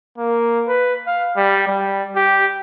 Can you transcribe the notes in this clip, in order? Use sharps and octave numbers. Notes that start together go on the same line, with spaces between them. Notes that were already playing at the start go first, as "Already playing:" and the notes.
A#3
B4
F5
G3
G3
G4